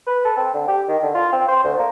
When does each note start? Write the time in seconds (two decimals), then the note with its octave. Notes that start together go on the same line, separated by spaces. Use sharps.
0.07 B4
0.25 A4
0.37 C4
0.54 D3
0.68 G4
0.88 D#3
1.03 D3
1.15 F4
1.32 C4
1.48 C5
1.64 D2
1.78 A#3